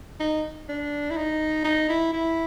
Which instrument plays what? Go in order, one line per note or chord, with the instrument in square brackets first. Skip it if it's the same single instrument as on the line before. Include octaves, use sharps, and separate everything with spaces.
[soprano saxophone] D#4
D4
E4
D#4
D#4
E4
E4